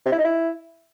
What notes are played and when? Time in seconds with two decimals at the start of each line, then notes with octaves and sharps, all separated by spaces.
0.06 C3
0.12 E4
0.18 D#4
0.25 E4